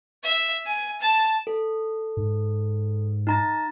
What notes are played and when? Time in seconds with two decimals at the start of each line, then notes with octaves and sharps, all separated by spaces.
0.23 E5
0.66 G#5
1.01 A5
1.47 A4
2.17 G#2
3.27 D#4 A#5 A6